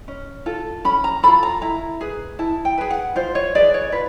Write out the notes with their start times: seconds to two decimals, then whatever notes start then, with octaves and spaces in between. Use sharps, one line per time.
0.08 C#4
0.46 F4 A4
0.85 C#4 B5
1.04 A#5
1.23 F4 A4 B5
1.43 A#5
1.62 E4 A#5
2.01 G#4 B4
2.39 E4 A5
2.65 G5
2.78 G#4 B4
2.91 F#5
3.16 F4 C5
3.35 C#5
3.55 G#4 B4 D5
3.74 C#5
3.92 F4 B4